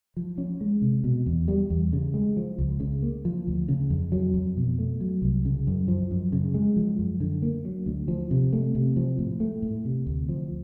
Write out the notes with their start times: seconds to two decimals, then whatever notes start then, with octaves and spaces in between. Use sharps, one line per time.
0.17 F3
0.38 C#4
0.61 G#3
0.82 C3
1.04 B2
1.26 E2
1.48 G3
1.70 E2
1.93 C#3
2.14 G#3
2.37 F3
2.58 C#2
2.80 C#3
3.02 A#3
3.25 F3
3.47 D2
3.68 C#3
3.90 F2
4.12 F#3
4.34 F2
4.57 B2
4.79 A3
5.01 F#3
5.22 C2
5.45 C#3
5.67 F#2
5.88 F3
6.11 F#2
6.32 C#3
6.54 G#3
6.76 F3
6.99 F#2
7.20 D3
7.42 A#3
7.65 F#3
7.86 D2
8.08 F3
8.31 C3
8.53 A3
8.75 C3
8.97 F3
9.19 A2
9.40 A3
9.62 A2
9.85 C3
10.06 D2
10.29 F3